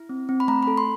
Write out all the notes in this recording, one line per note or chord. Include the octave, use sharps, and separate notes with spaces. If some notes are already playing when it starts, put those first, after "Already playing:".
Already playing: E4
C4
C4
B5
A3 A#5
A4 B5
C6